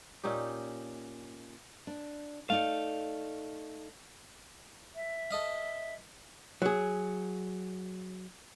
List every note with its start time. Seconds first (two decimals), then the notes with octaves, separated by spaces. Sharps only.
0.24 A#2 C#4 D#4 G4
1.87 D4
2.50 A3 D#4 D5 F5
4.95 E5
5.31 A4 D#5 F5
6.62 F#3 G#4